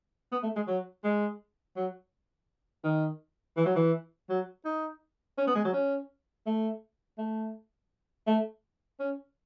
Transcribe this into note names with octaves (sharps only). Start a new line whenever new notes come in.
B3
A3
G#3
F#3
G#3
F#3
D#3
E3
F#3
E3
F#3
D#4
C#4
B3
G#3
F#3
C#4
A3
A3
A3
C#4